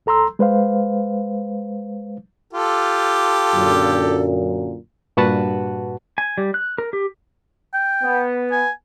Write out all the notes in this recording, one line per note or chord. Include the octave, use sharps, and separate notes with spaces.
C#2 A4 A#5 C6 E6
G#3 B4 C5 F5
F4 G4 A4
F#2 A#2 D3
G2 A#2 F#4 B4 F#5 A5
G#5
G3
F#6
A#4
G4
G5
B3
G#5